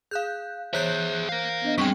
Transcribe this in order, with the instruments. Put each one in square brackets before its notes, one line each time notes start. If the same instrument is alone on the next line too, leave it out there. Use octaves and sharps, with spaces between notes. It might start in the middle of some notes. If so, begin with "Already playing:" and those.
[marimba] G#4 [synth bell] F5 F#6 G6
[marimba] E3 C#5 [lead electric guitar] G#4 E5 [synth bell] C5 F#6 G6
[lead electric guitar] A#4 F5
[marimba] B3 D4 D#5
[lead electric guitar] F#2 G#3 [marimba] G3 C4 [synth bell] G5 C#6